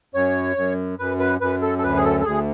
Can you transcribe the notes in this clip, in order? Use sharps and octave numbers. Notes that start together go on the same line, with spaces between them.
F#2 C#5
F#2
F#2 B4
B4
F#2 B4
A4
A4
D2 B4
G#4
A4
A4
D2 G#4